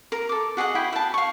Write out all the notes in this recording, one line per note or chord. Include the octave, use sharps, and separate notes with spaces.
A#4
A4 D6
F#4 G#4 D#5 F#5
E4 G5 B5
E5 A5
F5 C#6